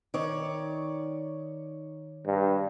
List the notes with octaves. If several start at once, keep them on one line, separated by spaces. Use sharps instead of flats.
D#3 C#5 D5
G2